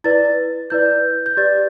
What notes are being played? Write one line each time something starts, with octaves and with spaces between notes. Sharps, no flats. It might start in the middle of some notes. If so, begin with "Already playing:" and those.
E4 B4 D5 A6
E4 B4 D5 G6
G6
G4 B4 D5 A6